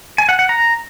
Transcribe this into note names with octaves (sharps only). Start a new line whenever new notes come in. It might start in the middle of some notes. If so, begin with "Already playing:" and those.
G#5
F#5
F#5
A#5